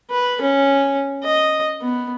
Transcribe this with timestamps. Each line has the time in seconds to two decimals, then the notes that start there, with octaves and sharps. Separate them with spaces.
0.10 B4
0.42 C#4
1.24 D#5
1.81 B3